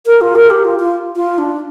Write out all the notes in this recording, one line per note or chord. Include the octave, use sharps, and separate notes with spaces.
A#4
F4
A#4
G4
F4
F4
F4
D4